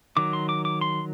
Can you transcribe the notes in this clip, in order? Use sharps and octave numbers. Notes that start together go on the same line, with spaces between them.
D#3 F#3 D6
C6
D6
D6
C6